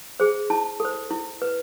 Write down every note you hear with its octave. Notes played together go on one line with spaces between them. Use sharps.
G#4 C5
E4 A5
A4 C5
E4
B4